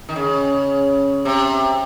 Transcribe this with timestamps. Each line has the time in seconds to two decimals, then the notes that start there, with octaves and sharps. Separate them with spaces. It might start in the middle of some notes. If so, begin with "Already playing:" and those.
0.09 D#3
0.16 C#3
1.25 C3